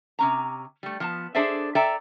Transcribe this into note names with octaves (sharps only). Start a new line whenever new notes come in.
C3 C#4 A#5
G3 A3
F3 B3 A5
D4 G#4 A4 C5 D5 E5
A4 D5 E5 G5 A#5